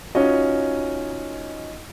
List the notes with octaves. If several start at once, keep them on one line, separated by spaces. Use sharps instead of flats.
C#4 D#4 F4 F#4 C#5 D#5